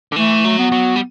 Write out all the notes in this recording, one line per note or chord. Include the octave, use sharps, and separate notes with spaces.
D3
E3 A3
F#3
B3
F#3
G3